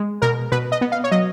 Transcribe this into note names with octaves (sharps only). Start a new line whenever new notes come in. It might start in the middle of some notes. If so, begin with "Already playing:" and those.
Already playing: G#3
B2 A#4
B2 B4
D#5
B3
F5
C#5
F#3 D#5